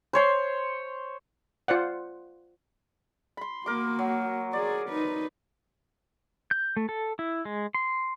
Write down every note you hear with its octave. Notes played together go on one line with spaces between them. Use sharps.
C5 C#5 C6
F4 C5 D5 F#5
B5 C6
A#3 F#4 A#4 D6
F#3
F#4 G#4 D5
D#4 B4
G6
A3
A4
E4
G#3
C6